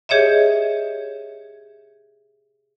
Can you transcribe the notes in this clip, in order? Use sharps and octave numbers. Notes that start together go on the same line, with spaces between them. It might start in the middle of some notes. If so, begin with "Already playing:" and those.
G4 G#4 C#5 D#5 E5